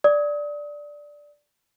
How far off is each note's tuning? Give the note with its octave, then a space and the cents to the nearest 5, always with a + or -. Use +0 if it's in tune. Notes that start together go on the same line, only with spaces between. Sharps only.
D5 +0 D#6 +35